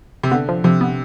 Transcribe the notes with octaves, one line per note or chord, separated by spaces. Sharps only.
C3
D3 B3
F3
C3 F3
B3